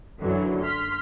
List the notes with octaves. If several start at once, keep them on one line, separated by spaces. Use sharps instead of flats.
F#2 D3 E3 F#3
C6 F6 B6